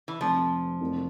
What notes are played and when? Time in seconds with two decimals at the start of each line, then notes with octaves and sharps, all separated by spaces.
0.08 E3
0.20 F1 F2 C3 F3
0.81 F1 F2 E3 A#3